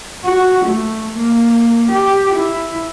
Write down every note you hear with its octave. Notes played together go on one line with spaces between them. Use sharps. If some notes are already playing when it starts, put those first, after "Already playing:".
F#4
A3
A#3
G4
E4